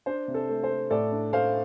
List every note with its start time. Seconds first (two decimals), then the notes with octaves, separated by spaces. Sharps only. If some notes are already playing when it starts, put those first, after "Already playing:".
0.06 D4 C5
0.28 C3
0.34 A4
0.49 A3
0.63 C5
0.70 A3
0.90 A2 A4 D5
1.12 D4
1.33 A3 C5 F5